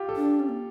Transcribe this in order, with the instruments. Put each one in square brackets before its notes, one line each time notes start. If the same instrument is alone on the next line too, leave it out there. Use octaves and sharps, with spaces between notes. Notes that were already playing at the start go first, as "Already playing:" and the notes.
Already playing: [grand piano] F4 G4
A4
[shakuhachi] D4
C#4
A#3